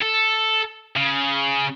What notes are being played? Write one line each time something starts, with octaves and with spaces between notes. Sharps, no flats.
A4
C#3